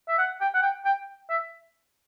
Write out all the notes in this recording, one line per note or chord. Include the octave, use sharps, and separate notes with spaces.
E5
F#5
G5
F#5
G5
G5
E5